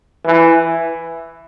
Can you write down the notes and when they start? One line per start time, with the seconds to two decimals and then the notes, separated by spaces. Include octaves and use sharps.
0.25 E3